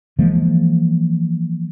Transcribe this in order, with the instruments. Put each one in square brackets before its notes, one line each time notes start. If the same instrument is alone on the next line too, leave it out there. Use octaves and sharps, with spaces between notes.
[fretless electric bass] E3 F3 G#3 A#3